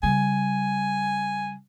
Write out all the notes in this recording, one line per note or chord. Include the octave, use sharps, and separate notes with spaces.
C#3 G3 G#5